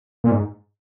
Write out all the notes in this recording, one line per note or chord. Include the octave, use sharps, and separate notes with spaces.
A#2
G#2